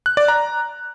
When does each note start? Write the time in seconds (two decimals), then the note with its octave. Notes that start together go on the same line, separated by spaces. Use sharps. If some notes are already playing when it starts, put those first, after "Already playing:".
0.06 F#6
0.17 D5
0.28 A#5